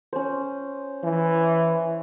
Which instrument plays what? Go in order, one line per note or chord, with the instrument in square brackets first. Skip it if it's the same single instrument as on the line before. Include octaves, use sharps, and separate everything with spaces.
[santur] C#4 C5
[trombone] E3